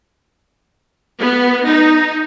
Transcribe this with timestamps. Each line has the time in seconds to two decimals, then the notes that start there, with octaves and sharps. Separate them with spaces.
1.20 B3
1.67 D#4